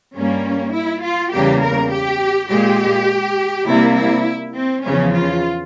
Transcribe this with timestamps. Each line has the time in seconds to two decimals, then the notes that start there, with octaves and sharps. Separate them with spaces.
0.16 G2 G3 A#3 C#4
0.74 E4
1.03 F4
1.33 E2 C#3 G3 A#3 G4
1.62 A#4
1.92 G4
2.50 A#2 G#3 G4
3.67 C3 G3 A#3 E4
3.97 E4
4.56 C4
4.84 E2 C#3 F3 C#4
5.14 F4